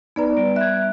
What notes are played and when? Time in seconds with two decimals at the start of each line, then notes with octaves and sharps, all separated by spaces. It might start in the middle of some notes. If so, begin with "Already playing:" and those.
0.16 B3 D#4 B4 D5 A#5
0.37 G3 D7
0.56 E5 F#6 G#6